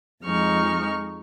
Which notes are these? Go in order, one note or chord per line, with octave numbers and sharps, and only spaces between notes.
F2 F3 G#3 D#4 C#6 F6